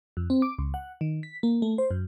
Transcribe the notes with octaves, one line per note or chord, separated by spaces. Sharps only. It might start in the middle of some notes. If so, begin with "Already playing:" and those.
F2
C4
D6
C#2
F#5
D#3
B6
A#3
A3
C5
F#2